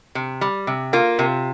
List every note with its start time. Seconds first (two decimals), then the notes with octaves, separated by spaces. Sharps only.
0.15 C3
0.41 G3
0.67 C3
0.93 A#3 F4
1.19 C3